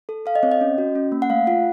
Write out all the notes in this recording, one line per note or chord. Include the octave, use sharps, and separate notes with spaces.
A4
A4 F5
D#5
C4 C#5
D#5
C#4
F#4
C#4
A#3
F#5
A3 F5
F4 F#5